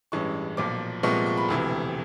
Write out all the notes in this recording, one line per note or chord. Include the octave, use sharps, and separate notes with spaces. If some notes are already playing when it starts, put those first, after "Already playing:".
A1 G2 E3 G#3 C#4 C#6
B1 A#2 F3 D6
C2 A#2 F3 G#3 B3 C#6
C#6
B5
E1 D2 C3 E3